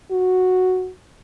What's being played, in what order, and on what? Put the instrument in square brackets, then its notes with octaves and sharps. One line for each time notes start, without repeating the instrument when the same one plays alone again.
[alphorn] F#4